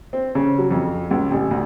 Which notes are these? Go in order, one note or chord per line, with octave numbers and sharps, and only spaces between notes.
C4
C#3
F#3
F2
C#2
A1
D2